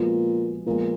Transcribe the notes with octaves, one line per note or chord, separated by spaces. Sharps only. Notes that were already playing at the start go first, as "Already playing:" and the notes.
Already playing: A#2 F3 G#3 B3 F#4
A#2 F3 G#3 B3 F4 A#4